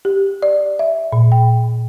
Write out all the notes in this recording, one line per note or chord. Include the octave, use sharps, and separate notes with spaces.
G4
D5
E5
A#2
G5